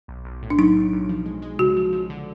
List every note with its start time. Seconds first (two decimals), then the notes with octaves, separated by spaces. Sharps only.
0.08 B1
0.25 B1
0.42 A2
0.50 D4
0.58 F#3 D#4
0.76 B1
0.93 B1
1.09 F3
1.26 G#3
1.42 G#3
1.59 C#3 F#4
1.77 F3
1.93 F3
2.10 D3